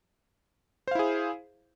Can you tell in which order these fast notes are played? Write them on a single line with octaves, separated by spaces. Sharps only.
C5 F5 E4 G#4